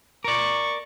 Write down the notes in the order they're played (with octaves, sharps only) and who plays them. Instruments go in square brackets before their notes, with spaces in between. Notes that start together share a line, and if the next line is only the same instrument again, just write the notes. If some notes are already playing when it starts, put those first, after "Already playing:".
[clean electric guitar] A#4 D5 [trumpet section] C#6